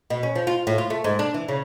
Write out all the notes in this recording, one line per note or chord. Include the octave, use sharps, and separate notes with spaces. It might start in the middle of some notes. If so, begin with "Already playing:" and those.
B2
C#4
F3
F4
A2
F4
A3
G#2
D4
E3
C#3